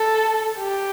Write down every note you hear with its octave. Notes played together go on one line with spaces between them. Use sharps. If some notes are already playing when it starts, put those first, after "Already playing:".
Already playing: A4
G4